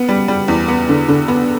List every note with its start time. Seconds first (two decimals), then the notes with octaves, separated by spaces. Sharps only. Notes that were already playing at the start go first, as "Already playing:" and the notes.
Already playing: B3
0.09 G3
0.28 G3
0.48 E2
0.68 B3
0.89 D3
1.08 D3
1.28 B3